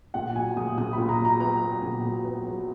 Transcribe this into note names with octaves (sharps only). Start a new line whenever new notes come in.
A#2 F#5
F#3 G#5
A#2 D#6
A#2 D#6
A#2 B5
A#5
F#3
A#5
B3 A#5
F#3
A#2
F#3
B3
F#3